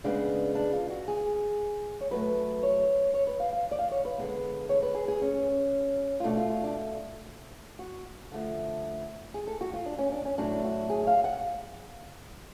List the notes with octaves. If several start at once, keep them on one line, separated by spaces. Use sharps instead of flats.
C#3 G#3 B3 D4
D4
F4
F#4
G#4
C#5
B2 F#3 A3 B4
C#5
C#5
B4
F5
F5
D5
F5
C#5
B4
D3 G#3 B3
C#5
B4
G#4
G#4
C#4
F4
B2 A3 D4
F4
F4
D4
F#4
D3 F3 A3
G#4
A4
F#4
F4
D4
C#4
D4
C#4
A2 F#3 A3 D4
F#4
G#4
F5
F#5